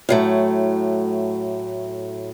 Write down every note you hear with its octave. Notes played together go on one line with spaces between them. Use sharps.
A2 F#3 A3